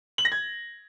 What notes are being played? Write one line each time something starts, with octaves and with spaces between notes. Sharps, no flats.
F#7
A#6
G#6